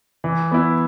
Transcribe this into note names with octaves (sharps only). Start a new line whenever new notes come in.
E3
B3 E4